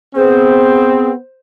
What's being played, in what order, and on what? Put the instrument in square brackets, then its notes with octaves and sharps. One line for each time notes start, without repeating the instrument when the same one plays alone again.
[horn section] B3 C4 [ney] G#4 [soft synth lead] C5